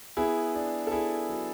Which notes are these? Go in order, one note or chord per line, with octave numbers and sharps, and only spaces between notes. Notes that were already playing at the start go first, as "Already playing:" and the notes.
B3 E4 G#4
D4
A4
B3 E4 G#4
F#3